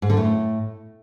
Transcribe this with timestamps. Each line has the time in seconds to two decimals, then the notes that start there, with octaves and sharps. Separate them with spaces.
0.02 G#2
0.10 D3
0.17 A2